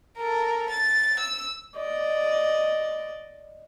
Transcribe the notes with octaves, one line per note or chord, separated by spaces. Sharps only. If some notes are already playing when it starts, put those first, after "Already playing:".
A4 A#4
A6
E6
D5 D#5